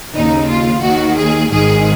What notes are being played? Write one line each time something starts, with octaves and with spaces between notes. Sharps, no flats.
D#2 C#3 D#4
F4
D#2 D#3 F#4
G#4
G#1 G#2 D#3 G#4